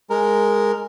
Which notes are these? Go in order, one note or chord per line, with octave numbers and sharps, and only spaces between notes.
G#3 A#4